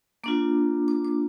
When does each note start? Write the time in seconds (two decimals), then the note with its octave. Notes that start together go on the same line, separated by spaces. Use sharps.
0.24 A#3 D4 F4 D6
0.88 D6
1.05 D6